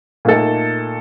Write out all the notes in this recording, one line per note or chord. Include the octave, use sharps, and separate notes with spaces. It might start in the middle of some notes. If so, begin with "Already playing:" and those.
A#2 A3 D#4 A4